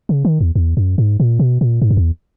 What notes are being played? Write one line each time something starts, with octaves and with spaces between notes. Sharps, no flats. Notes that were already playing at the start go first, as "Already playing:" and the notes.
C#3
D#3
E2
E2
F#2
G#2
A#2
B2
A#2
G#2
F#2
E2